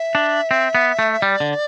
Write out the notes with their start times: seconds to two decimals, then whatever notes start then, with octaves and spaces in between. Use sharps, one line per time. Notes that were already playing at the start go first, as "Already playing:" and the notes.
Already playing: E5
0.15 D4
0.51 C4
0.75 B3
0.99 A3
1.22 G3 D5
1.40 D3